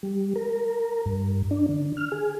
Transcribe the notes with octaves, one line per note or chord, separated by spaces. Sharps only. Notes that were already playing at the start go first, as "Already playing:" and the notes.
G3
A#4
G2
D4
D3
F6
G#4